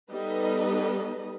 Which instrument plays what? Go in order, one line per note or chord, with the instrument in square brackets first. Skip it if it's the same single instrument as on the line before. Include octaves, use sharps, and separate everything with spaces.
[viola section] G3 B3 D#4 A4 B4 D#5